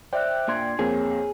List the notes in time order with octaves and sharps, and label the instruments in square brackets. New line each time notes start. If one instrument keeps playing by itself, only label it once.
[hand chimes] C5 E5 F#6 [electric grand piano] D5 G5
[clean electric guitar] A#2 [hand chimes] D4 C6 G#6
[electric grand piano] F2 A#3 C4 [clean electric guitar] G#4 [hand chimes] C#5